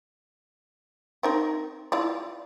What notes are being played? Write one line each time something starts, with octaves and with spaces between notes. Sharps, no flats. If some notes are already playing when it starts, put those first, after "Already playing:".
C4 D#4 A#4
E4 F4 D5